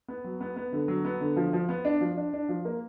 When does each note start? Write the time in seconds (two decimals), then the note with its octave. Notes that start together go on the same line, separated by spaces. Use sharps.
0.08 B3
0.24 F#3
0.41 B3
0.56 B3
0.73 D3
0.88 F#3
1.05 B3
1.21 D3
1.36 F3
1.53 F3
1.69 B3
1.85 D4
2.01 F3
2.17 D4
2.33 D4
2.49 F3
2.65 A#3